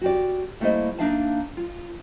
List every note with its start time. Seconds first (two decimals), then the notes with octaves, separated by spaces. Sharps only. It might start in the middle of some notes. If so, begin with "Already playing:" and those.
0.01 F#4 G4 D5
0.60 G3 A3 A#3 E4 C5 D#5
0.99 A#3 D4 D#4 E5 F5 A5
1.57 F4